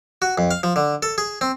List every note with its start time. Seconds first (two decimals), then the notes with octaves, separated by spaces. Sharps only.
0.22 F#4
0.38 F2
0.51 F5
0.63 F3
0.76 D3
1.02 A4
1.18 G#4
1.41 C4